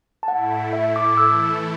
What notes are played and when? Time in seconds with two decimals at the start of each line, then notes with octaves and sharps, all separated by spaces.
0.23 A5
0.28 A2 A3 E4 F#5
0.73 E5
0.96 D6
1.17 E3 A3 E4 A4 E6